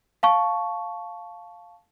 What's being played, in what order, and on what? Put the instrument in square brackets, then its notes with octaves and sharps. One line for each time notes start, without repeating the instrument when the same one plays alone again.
[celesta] F5 A5 C#6